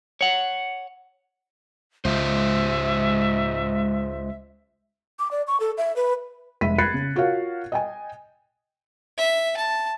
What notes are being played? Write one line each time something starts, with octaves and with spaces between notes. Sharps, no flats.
C#5 F#5
C#2 G#3 F4 C5 E5
D6
D5
C#6
A4
E5
B4
F1 G#3 E5 B5 B6 D#7
B5 F#6 G#6 A6 C7 C#7
C#3
F4 F#4 A#4 C#5 F5
D#5 G5 G#5
E5
A5